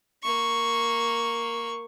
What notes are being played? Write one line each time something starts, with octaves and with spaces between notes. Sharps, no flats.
A#3 C#6